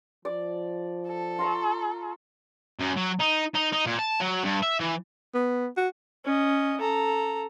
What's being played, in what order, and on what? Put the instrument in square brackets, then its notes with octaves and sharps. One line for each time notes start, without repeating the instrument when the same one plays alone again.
[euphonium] F3 [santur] D5
[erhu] A4
[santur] F4 A#5 C#6
[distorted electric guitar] F#2
F#3
D#4
D#4
D#4
A#2
A5
F#3
G2
E5
E3
[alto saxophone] B3
F#4
[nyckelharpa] C#4 D#5
A4 A#5